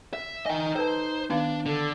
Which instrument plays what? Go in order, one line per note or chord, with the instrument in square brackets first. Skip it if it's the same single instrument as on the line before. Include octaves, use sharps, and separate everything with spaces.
[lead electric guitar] E5
[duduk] D#4 [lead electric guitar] D#5 G5 [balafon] G#5
[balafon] A4 B4 A5 [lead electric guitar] C5
[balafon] D#3 B3 F5 [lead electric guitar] D4
[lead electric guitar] D3 [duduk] A4